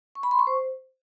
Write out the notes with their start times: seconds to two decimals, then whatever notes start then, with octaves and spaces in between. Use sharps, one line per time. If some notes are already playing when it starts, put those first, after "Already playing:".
0.15 C#6
0.23 B5
0.31 C6
0.39 C#6
0.47 C5